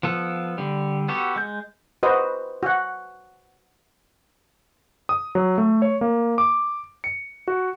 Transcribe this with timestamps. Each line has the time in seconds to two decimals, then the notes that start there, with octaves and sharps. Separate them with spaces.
0.03 F3 B3 A4
0.58 D3 G3
1.08 B3 F#4 G4 A4
1.36 G#3 G6
2.03 F#4 B4 C5 D#5
2.63 F#4 F#5
5.09 D#6
5.35 F#3
5.58 A3
5.82 C#5
6.01 A#3
6.38 D6
7.04 C#7
7.48 F#4